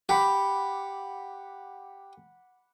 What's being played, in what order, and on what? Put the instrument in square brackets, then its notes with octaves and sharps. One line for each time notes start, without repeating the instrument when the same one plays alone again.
[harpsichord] G4 [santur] F#5 B5 D6